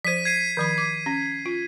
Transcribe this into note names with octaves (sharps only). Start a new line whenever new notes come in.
F3 C5 B6 D#7
G#6 C7 D#7
D#3 F3 B5
D6
C#4
F4